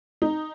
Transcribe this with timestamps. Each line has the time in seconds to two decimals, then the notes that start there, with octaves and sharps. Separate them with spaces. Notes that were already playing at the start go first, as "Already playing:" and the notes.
0.22 D#4